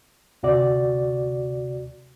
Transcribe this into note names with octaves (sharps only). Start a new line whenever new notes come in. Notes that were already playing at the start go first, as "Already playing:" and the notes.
D2 C3 F#4 D5